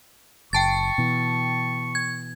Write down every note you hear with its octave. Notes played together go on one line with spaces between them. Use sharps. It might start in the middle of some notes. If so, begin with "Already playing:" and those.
F#1 G5 A5 C#6 A6
B2 E3
G#6